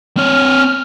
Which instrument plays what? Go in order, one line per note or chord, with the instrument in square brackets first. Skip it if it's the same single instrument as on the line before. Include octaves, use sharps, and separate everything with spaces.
[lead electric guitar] C4 C#5 [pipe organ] F6